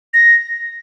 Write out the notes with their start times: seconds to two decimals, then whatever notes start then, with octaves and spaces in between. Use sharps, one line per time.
0.14 A#6